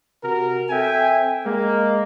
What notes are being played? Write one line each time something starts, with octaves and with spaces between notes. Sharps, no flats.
C3 F#4 A#4
C4 A4 E5 G5 G#5
G#3 A#3